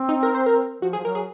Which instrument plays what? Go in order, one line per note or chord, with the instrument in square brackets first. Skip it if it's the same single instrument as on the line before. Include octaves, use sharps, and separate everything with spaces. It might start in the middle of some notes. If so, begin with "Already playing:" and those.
Already playing: [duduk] C4
[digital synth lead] D#4
A#4
C5
A#4
[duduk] F3 [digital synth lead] F#4
[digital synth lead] G#4
[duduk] F3
[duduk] F#3 [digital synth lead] A#4
[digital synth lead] G#4